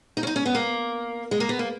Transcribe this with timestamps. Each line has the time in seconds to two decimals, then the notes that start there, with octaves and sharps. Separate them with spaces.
0.17 D#4
0.23 C#4
0.27 D#4
0.36 C#4
0.46 B3
0.55 A#3
1.31 G#3
1.40 A#3
1.49 B3
1.59 A#3